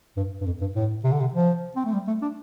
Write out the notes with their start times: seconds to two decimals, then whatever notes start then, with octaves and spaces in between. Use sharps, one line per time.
0.17 G2
0.41 G2
0.46 F2
0.61 G2
0.75 A2
1.04 C3
1.12 D3
1.20 C3
1.34 F3
1.76 C4
1.85 A3
1.94 G3
2.07 A3
2.22 D4